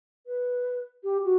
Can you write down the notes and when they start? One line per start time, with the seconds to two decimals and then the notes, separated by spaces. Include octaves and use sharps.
0.26 B4
1.03 G4
1.24 F#4